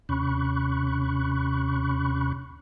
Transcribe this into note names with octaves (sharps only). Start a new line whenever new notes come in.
D#2 C3 C#4 B5 C#6 F#6